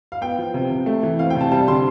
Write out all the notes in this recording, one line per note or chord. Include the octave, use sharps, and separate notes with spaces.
F5
B3 G5
F3
C3
C3
A3
E3
C4 F5
C3 G5
A5
G3 A5
D3 C6